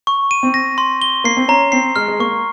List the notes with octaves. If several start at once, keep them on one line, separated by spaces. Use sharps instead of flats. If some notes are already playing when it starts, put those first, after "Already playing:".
C#6
D#7
C4
A#6
C6
G7
A#3 C7
C4
C#4 A#5
C4 C7
G#3 F6
G#3
A#3 C#6